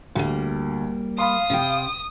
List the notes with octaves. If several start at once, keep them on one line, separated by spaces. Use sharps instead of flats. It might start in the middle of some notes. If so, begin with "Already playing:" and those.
D2 G3 A#3
F5 B5 C6 D#6
C3 G5